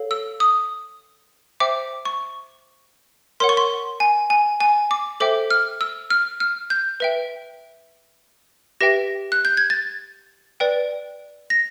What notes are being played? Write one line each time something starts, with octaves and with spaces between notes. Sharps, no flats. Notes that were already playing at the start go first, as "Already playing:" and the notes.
Already playing: A4 C#5 F5
E6
D#6
C5 E5 G5 D6
C#6
A#4 C#5 F#5 C6
C#6
C6
G#5
G#5
G#5
D6
A4 C5 E5 G5 D6
F6
E6
F6
F6
G6
B4 E5 G5
G4 B4 E5 G5 A#6
F#6
G6
G#6
A6
B4 D5 G5
A#6